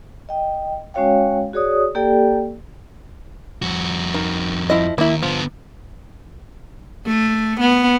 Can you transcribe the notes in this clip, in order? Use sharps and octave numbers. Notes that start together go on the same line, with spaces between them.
D#5 G5
G#3 C#4 F#4 C#5 F5 G5
F#4 G#4 C#5 D5 D#6
A#3 G4 A4 D5 G5
F2 F#4
D#3
F3 E4 D#5
D#2 A#3 E4
D3 F3 B3
A3
B3